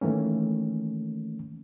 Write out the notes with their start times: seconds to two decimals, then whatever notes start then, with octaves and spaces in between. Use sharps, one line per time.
0.01 D#3 E3 A3 A#3 C#4